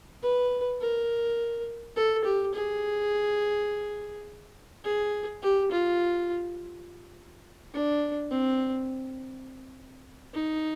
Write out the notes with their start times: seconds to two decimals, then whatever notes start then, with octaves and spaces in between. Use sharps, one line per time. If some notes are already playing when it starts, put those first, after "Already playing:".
0.22 B4
0.81 A#4
1.96 A4
2.24 G4
2.54 G#4
4.84 G#4
5.43 G4
5.71 F4
7.74 D4
8.31 C4
10.34 D#4